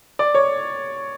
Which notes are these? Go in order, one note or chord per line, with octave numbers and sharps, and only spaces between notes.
D5
C#5